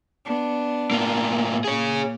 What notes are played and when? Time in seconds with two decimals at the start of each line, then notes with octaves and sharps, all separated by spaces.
0.24 B3 D4
0.91 A2 A#3
1.64 A#2 G#4 C#5